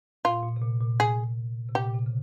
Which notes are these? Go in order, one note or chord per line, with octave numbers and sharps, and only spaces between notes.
A#2 F4
A#2
C3
A#2
A#2
G#4
C3
A#2 G4
A#2
C3
C#3